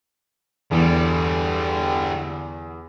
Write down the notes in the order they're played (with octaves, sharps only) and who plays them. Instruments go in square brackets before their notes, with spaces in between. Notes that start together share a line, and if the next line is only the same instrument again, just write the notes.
[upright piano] E2 E3 [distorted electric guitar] D3 G3